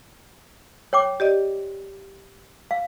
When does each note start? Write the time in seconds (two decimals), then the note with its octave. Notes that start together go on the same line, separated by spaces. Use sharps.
0.93 C#5 G5 D6
1.20 G4 D5 D#5
2.71 F5